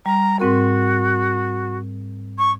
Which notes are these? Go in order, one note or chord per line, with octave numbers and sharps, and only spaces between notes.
G3 A#5
G#2 C4 F#4 A#4
C#6